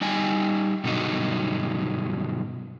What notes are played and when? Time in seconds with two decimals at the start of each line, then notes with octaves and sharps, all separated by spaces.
0.01 G3 D#4 G5 G#5
0.84 G2 B2 D3 F#3 D#4